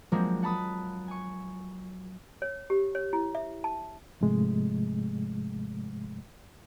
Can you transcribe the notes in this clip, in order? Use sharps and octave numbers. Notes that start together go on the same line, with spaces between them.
F3 F#3 G#3 A#3 C4 D4
F#5 A5 B5 D#6
G#5 C#6
C#5
G4
C#5
E4
E5
A5
G#2 C3 F3 G#3 A3